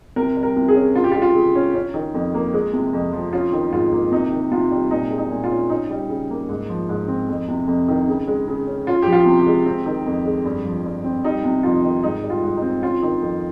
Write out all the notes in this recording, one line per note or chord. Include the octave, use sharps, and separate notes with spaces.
C3 A#4
G3
A#4
C3
G#4
C#4
C#3 F4
G4
F4
G#3
F4
C#3
C#4
C#4
D#3
F2
A#3
G#3
C3
F2
F3
C#4 F4
D#3
G#2 F4
A#3
C3 D#4
D#3
C3 F4
G3
A#2 D#4
G#3
D#4
A#2
F4
C#4
C#4 D#4
G3
C#3
A#3
G#2
F3
G#2
C4
F2
C3
F2
D#3
C#3
G#3
C#3
C#4
C#4 F4
F3 G4
F4
C3
G4
G#3
C4
D#3
F2
G#3
G2
F3
G2
C4
G3 D#4
C3
F2 F4
D#3
G#2 D#4
G3
F4
G#2
D#4
C4
C#4 F4
D#3
F2